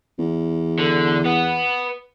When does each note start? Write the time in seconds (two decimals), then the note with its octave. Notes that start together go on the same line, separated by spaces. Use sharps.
0.19 E2
0.79 D3
1.25 B3